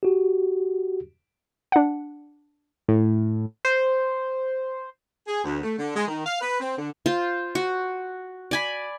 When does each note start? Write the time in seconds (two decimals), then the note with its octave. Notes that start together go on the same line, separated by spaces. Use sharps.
0.03 F#4 G4
1.72 D4 F#5
2.88 A2
3.65 C5
5.27 G#4
5.44 D2
5.63 A3
5.79 D3
5.96 G#3
6.08 D#3
6.26 F5
6.41 B4
6.60 C4
6.78 D3
7.06 F4 C5 F5
7.55 F#4
8.51 D5 G#5 B5